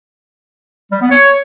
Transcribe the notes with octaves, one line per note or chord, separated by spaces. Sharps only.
G3
B3
C#5